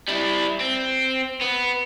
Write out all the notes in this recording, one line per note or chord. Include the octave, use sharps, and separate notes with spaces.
G3 E4
C4
B3